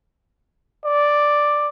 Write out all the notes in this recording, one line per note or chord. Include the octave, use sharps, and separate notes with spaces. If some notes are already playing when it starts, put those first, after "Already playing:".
D5